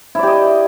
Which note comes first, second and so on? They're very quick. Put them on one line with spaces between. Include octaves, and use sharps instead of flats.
E4 D5 G4 D#5